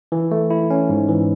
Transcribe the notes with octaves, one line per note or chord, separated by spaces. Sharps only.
E3
A3
E4
C#4
G#2
E3